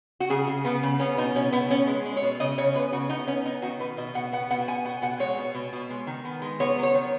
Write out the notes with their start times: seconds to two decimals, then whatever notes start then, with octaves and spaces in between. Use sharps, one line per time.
0.20 F#4
0.30 C#3 G#4
0.48 C#3
0.65 C#3 B3
0.83 C#3
1.00 B3 C#4
1.17 B2 D#4
1.35 B2 C#4
1.52 B2 B3
1.70 B3 C#4
1.87 G#3
2.06 G#3
2.16 C#5
2.22 B2
2.40 C#3 D#5
2.58 C#3 C#5
2.74 B3 B4
2.92 C#3 F#4
3.09 B3 D#4
3.28 B3 C#4
3.45 B3 D#4
3.62 D#3 F#4
3.79 B2 B4
3.97 B2 D#5
4.14 B2 F#5
4.32 B3 F#5
4.50 B2 F#5
4.68 B3 G#5
4.85 B2 F#5
5.02 B2 F#5
5.19 G#3 C#5
5.38 B2
5.55 B2
5.73 B2
5.90 G#3
6.07 D#3
6.25 B3
6.42 G#3
6.60 B3 C#5
6.78 F#3
6.83 C#5
6.94 D#3